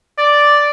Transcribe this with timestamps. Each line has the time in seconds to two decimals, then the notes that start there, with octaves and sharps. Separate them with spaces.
0.19 D5